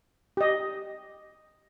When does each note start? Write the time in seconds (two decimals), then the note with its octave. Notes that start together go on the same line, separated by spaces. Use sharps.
0.37 G4 D#5